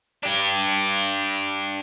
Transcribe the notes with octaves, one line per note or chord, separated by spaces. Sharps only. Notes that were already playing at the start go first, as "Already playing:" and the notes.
D4 G4